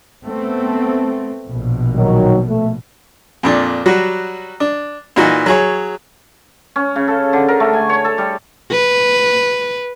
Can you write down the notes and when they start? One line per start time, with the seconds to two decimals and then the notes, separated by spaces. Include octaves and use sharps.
0.24 A3 B3 C4
1.47 A#1 B2
1.95 D#3 F#3
2.47 A3
3.43 F2 A#2 D4
3.86 F#3 G3 F#4
4.60 D4
5.16 A#2 E3 D#4 F#4
5.46 F#3 G#4 C#5
6.76 C#4
6.96 C#3
7.08 A4
7.33 D3
7.48 A#4
7.60 A3
7.73 G#5
7.89 C#5
8.05 A4
8.18 G3
8.72 B4